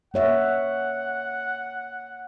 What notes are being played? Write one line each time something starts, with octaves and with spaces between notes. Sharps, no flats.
A#3 C#5 E5 F#5